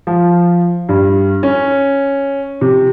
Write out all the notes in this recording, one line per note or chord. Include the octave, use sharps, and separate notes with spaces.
F3
G2
C#4
C3